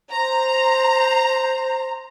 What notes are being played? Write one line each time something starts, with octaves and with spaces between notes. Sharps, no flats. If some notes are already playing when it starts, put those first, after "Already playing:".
C5 A#5